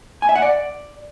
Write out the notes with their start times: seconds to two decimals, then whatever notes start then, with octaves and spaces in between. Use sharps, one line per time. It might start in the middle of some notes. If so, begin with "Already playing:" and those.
0.22 G#5
0.29 E5
0.35 F#5
0.42 D5